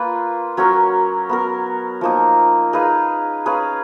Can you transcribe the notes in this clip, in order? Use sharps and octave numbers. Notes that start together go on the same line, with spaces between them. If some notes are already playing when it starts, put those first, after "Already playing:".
Already playing: A#3 F4 B4
F#3 C#4 F#4 A#4
B3 F#4 A#4
F3 A#3 D#4
D#4 G#4 B4 F5
C#4 G#4 B4 F5